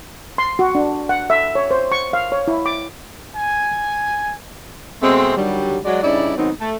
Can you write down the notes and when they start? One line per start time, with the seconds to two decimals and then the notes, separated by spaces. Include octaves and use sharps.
0.38 C6
0.59 F#4
0.75 D4
1.09 F#5
1.30 E5
1.55 C#5
1.71 C5
1.92 C#6
2.13 F5
2.32 C#5
2.48 E4
2.66 D6
3.36 G#5
5.02 B2 G#3 A3 C4
5.37 D3 D#3 F#3 G3
5.85 F#3 G#3 D5
6.03 G2 C#3 D#4 E4 D5
6.37 G#2 D#3 F#3 B3 C4 D#4
6.59 A3